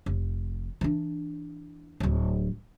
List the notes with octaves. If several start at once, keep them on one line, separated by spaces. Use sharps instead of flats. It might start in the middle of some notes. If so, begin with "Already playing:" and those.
F1
E3 D4
D1 F#3